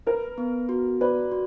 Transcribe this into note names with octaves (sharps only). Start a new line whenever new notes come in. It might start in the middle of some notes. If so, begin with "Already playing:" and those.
A#4 B4
B3
F#4
B4 D5
F#4